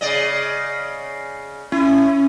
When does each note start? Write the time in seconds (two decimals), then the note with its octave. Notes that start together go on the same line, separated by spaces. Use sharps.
0.01 C#3 D5 D#5
1.72 C#4 E4